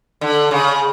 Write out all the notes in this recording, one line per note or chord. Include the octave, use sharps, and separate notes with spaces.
D3
C#3